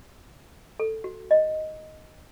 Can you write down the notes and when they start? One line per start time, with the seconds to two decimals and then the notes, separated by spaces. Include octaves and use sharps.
0.80 A4
1.04 F#4
1.31 D#5